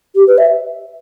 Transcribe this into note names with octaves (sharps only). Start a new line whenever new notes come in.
G4
B4
E5